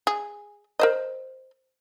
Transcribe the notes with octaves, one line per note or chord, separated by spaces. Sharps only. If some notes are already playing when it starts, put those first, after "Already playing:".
G#4
A#4 C5 D#5